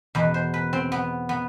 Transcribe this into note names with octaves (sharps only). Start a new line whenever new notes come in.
E2 B2 B4
C5
B4
C4
B3
B3